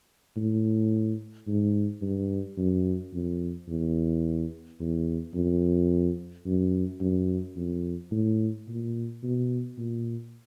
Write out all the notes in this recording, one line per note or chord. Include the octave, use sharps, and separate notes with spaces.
A2
G#2
G2
F#2
F2
E2
E2
F2
F#2
F#2
F2
A2
A#2
B2
A#2